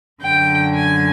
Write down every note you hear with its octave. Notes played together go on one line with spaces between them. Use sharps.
F#2 D3 F#3 G5
G#5